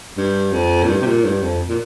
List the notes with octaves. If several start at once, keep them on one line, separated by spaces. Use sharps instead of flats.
G2
F2
A#2
G2
C3
A#2
G2
F2
A#2